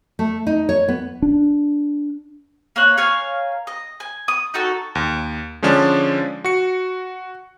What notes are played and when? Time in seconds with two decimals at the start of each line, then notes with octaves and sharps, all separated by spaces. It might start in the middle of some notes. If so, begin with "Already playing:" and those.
0.19 A3
0.47 D#4
0.69 C#5
0.88 B3
1.22 D4
2.76 A#3 C#5 F#6
2.97 A#4 C#5 F5 G#5
3.67 D#5
4.00 G#5
4.28 D#6
4.54 D#4 F#4 A4
4.95 D#2
5.62 D3 F3 G#3 C#4 D4
6.44 F#4 C#7